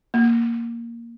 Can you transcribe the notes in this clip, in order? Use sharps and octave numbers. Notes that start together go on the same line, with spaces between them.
A#3